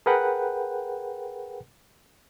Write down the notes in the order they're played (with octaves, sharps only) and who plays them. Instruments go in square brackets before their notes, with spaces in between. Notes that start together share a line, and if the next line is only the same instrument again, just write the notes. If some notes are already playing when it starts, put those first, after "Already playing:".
[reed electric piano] G#4 A#4 B4 F#5 G5